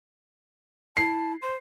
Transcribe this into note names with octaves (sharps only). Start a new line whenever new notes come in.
E4 A5 C7
C5 C6